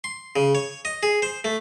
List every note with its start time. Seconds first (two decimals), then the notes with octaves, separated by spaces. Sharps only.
0.04 C6
0.36 C#3
0.55 C#5
0.85 D#5
1.03 G#4
1.22 C5
1.44 A3